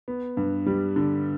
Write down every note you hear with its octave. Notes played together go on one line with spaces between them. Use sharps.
B3
G2
G3
D3